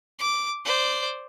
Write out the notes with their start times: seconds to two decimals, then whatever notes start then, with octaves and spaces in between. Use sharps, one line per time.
0.19 D6
0.65 C5 D5